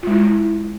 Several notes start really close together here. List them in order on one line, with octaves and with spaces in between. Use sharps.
F4 G#3 E4